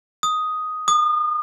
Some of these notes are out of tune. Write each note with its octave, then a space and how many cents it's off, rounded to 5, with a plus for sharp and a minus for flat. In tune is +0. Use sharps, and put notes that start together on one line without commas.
D#6 +5
D#6 -35